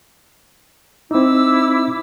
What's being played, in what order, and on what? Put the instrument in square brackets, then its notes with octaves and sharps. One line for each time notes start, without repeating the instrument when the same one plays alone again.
[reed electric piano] C4 D#4 [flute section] E4 D6 E6